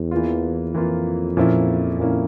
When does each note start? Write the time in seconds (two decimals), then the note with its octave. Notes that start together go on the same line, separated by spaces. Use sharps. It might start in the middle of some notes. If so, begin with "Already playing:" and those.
Already playing: E2
0.11 E3 A#3 F4
0.74 F2 E3 A#3 F4
1.37 A#2 F3 A#3 C#4 E4
1.99 A#2 F3 A#3 C#4 E4